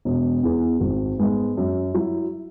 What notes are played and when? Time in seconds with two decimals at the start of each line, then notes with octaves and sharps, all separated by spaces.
0.05 E1
0.43 E2 E3 B3 G#4
0.80 G#1
1.18 G#2 G#3 B3
1.57 F#2
1.94 F#3 E4